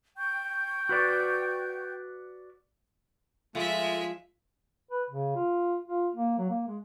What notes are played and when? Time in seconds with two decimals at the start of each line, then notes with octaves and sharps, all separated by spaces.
0.17 G5 C#6 G6
0.89 F#4 B4 D5
3.55 F3 G#3 A3 E5
4.91 B4
5.10 C#3
5.36 F4
5.88 F4
6.14 A#3
6.38 F#3
6.50 A#3
6.67 G#3